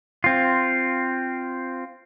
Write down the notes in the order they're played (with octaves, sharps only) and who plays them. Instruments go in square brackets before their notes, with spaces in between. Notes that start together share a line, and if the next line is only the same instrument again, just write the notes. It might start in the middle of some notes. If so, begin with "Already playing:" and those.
[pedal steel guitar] C4 F4